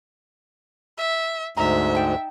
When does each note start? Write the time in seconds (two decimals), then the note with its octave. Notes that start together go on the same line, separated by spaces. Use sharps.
0.98 E5
1.57 D2 G#2 E5 A#5
1.95 D#4 G5 A5